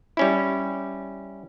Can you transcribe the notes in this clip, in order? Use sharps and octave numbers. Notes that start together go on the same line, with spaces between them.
G3 C#4 E4